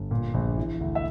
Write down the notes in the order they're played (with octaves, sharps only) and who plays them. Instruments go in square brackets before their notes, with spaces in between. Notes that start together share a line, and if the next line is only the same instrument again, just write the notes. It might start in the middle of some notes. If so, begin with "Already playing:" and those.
Already playing: [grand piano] G1
A#2
A#1
E3
D2
E5